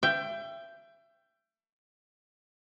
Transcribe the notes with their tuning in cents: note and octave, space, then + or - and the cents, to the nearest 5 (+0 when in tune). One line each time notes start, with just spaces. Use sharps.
E5 +30 G5 +0